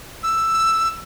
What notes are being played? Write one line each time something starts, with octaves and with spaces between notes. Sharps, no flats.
E6